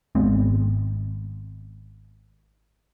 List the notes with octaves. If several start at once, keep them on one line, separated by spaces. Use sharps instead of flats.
G#1 G#3 B3 C4